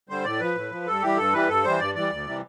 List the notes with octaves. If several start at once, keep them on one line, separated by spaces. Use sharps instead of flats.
D3 G3 C5
A2 D5
F3 B4
A2
F3
G2 A4
E3 G3 G4
G2 A4
E3 G3 B4
G2 A4
E3 G3 C5
G2 D5
E3 G3 D5
D2
C3 E3 G3